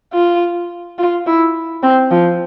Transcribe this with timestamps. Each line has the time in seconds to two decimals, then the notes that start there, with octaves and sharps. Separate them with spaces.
0.14 F4
0.98 F4
1.27 E4
1.83 C4
2.11 F3